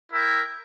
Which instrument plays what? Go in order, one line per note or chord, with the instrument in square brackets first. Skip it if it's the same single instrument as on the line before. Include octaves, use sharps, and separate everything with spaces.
[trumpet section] E4 A#4 E5 G5